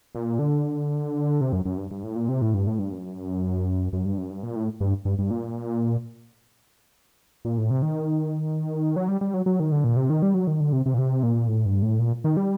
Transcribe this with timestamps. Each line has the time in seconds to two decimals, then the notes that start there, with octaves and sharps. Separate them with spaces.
0.15 A#2
0.39 D3
1.41 C3
1.52 F#2
1.65 F#2
1.78 G2
1.91 G2
2.03 A2
2.16 A#2
2.29 C3
2.42 A2
2.54 G2
2.67 A2
2.79 G2
2.92 F#2
3.93 F#2
4.05 G2
4.18 F#2
4.30 G2
4.43 A#2
4.56 A2
4.80 G2
5.05 G2
5.19 G2
5.31 A#2
7.45 A#2
7.58 A2
7.70 C3
7.82 D#3
8.96 F#3
9.08 G3
9.21 G3
9.34 F#3
9.46 F#3
9.60 D#3
9.72 D3
9.84 A#2
9.96 C3
10.10 D#3
10.22 G3
10.34 F#3
10.47 D#3
10.60 D3
10.73 C3
10.86 C3
10.94 A#2
10.98 C3
11.23 A#2
11.48 A2
11.66 G2
11.82 A2
11.99 A#2
12.24 D#3
12.37 G3